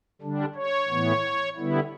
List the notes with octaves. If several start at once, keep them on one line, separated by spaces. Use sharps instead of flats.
D3 G3 D4
C#5
A2 E3 B3
D3 G3 B3 E4